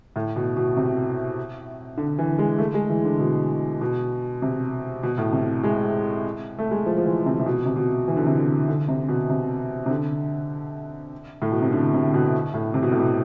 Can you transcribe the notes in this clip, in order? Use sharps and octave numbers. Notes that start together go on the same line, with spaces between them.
A2
B2
B2
C3
D3
E3
G#3
A3
G#3
E3
D3
B2
B2
C3
B2
A2
C3
G#3
A3
G#3
F3
F3
E3
C3
C3
B2
C3
B2
E3
D3
C3
D3
D3
C3
B2
C3
C3
D3
A2
B2
C3
D3
C3
B2
A2
C3
B2
A2
B2